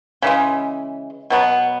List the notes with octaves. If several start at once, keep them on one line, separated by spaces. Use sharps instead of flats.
C#3 E3 G#3
B2 F#3 B3